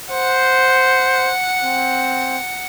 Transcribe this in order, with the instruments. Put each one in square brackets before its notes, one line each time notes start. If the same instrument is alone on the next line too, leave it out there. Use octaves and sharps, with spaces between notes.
[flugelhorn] C5 [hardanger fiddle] F#5
[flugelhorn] C4